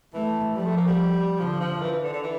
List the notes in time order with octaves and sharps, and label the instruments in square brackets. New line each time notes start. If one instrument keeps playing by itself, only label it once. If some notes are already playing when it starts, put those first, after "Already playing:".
[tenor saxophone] E3 [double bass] A3
[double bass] F3 [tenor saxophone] G3
[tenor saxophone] A3
A#3
G3
[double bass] D3 [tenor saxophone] F3
[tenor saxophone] F3
E3
E3
D3
D3
E3